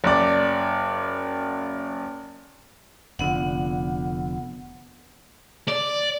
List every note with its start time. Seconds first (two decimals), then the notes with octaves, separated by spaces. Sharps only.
0.04 F#1 D5
3.19 F1 D3 F3 B3 F#5
5.68 D5